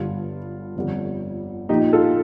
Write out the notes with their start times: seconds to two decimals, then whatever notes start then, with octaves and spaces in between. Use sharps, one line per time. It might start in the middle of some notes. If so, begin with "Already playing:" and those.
Already playing: G1 G2 D3 G3 F4
0.76 G1 F2 D3 G3
1.69 A#1 A#2 F3 D#4 G4
1.93 F4 A4